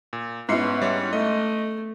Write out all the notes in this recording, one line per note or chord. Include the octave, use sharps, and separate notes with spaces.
A#2
G#2 B3 C#4 E4 E5 C7 C#7
G3 C#5
A3 D#5